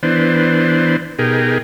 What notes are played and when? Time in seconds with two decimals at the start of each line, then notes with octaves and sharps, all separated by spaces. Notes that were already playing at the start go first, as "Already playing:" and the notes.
0.03 E3 B3 D4 C5
1.19 B2 D#4 G4 G#4 A#4